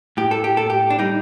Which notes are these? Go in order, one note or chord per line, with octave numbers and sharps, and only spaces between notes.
A2 G4
A4
G4
A2 A4
G4
D4
G3 D#4